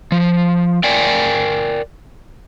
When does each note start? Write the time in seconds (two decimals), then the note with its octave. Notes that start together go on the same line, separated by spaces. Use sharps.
0.12 F3
0.84 A#4 D5 G5 G#5